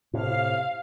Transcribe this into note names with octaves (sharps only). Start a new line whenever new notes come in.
A2 C3 F5